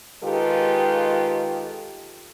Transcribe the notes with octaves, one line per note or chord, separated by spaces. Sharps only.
D#3 G#3 F4 G4 A4 B4